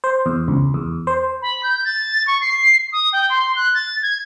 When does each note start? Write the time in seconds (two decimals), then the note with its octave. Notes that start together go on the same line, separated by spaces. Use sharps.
0.04 C5
0.26 E2
0.48 C#2
0.74 E2
1.07 C5
1.42 B5
1.63 G6
1.85 A6
2.27 C#6
2.41 C7
2.92 D#6
3.12 G5
3.29 C6
3.56 F#6
3.74 A6
4.02 G#6